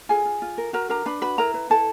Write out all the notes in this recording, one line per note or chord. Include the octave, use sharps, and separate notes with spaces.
F4 G#4 G#5
F4
F4
A#4
F#4 A#4 A#5
D4 A#4 A#5
D4 B4 B5
F#4 B4 B5
E4 A#4 A#5
B4
E4 A4 A5